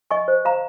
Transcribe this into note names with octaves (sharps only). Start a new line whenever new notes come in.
D#5 G#5 C#6
C5
F5 A#5